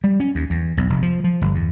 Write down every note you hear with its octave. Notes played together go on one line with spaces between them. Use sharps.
G3
C#4
D#2
E2
B1
F1
F3
F3
G1
E2